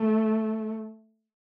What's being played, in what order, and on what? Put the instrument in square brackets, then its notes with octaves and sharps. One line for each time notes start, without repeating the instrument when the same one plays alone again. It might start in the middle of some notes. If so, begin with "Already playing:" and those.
Already playing: [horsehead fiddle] A3